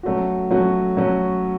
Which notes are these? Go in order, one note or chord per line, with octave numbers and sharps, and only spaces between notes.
F#3 A3 C#4 F#4
F#3 A3 C#4 F#4
F#3 A3 C#4 F#4